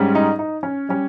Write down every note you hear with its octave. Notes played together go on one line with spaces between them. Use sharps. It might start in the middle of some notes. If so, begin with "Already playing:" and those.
Already playing: G#2 G3 C#4
D#4
D#4
C#4
G3 C#4